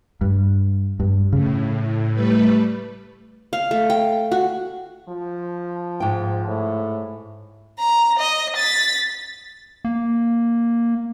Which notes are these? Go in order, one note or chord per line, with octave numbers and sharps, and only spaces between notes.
G2
G2
A2 C#3
G3 A3 B4
F5
A3
G5
F#4
F3
G#2 G5
A2
A#5
D#5
A6 B6
A#3